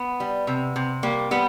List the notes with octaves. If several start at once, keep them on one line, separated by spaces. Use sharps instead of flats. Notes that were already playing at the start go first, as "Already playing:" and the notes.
Already playing: B3
G3
C3
C3
G3 A#3
G3 B3